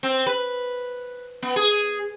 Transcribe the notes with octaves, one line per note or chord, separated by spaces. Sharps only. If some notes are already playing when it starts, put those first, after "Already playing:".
C4
B4
B3
G#4